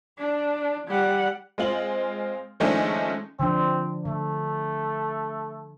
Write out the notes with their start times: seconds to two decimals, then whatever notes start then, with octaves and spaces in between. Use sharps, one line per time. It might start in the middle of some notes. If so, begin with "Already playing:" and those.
0.19 D4
0.88 G3 F#5
1.58 G#3 C4 F4 F#7
2.60 D#3 F3 G#3 A3 C#4 D4
3.40 D3 F3 C4 D4
4.05 D3 A3